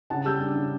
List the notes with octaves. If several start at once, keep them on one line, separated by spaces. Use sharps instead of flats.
C#3 F#5 A5
G3 E6 G6
D4
C#3